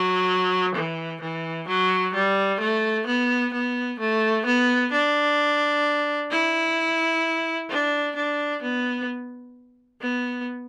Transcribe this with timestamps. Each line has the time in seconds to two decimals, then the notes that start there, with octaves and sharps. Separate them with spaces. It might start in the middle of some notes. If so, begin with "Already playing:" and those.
Already playing: F#3
0.75 E3
1.21 E3
1.67 F#3
2.14 G3
2.60 A3
3.06 B3
3.53 B3
3.99 A3
4.45 B3
4.92 D4
6.31 E4
7.69 D4
8.16 D4
8.62 B3
10.01 B3